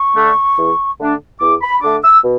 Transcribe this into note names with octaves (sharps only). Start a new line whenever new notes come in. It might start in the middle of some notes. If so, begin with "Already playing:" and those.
Already playing: C#6
D3 A3 D4
E2
D3 A3 D4
E2 D6
B5
D3 A3 D4 D6
E6
B2